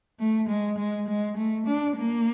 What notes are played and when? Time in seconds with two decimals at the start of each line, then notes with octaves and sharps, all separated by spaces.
0.19 A3
0.49 G#3
0.78 G#3
1.08 G#3
1.37 A3
1.67 D4
1.96 A#3